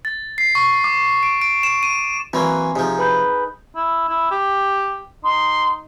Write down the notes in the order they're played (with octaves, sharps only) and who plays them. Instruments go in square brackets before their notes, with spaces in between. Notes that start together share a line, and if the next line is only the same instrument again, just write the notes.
[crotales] A6
C7
C#6
D6
D7
D7
E7
D#7
[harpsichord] E3 F#3 A#3 [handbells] C4 C6 [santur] G#5 A#5
[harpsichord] C3 F3 [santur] D#4 G#4
[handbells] B4 B5 G6
[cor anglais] E4
E4
G4
[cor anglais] D#4 [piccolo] C6